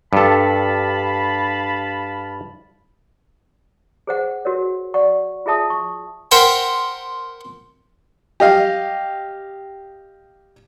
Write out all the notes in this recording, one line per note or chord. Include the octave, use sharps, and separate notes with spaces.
G2 A4 F5 A5 B5
G#4 C5 F#5
F#4 A#4 C#5
D5 F#5 C#6
F4 G#4 E5 A5 D#6
C#6
A#4 C5 F#5 G5 B5
G4 D#5 F5